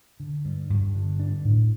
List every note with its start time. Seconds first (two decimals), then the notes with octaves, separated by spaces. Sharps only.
0.20 D3
0.45 G2
0.70 G2
0.95 D3
1.20 D4
1.45 A2